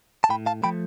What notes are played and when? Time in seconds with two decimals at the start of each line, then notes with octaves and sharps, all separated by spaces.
0.24 A5
0.29 A2 G5 B5
0.46 F5 A5
0.63 F3 A3 G5 B5